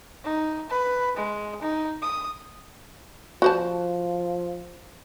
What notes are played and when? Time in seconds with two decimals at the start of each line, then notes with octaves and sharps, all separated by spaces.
0.24 D#4
0.69 B4
1.16 G#3
1.62 D#4
2.02 D#6
3.42 F3 F#4 C5 A5